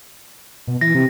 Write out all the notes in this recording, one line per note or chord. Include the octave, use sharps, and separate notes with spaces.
B2
E3 A#6
C3